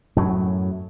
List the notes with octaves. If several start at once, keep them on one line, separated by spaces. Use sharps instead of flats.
F#2 A2 F#3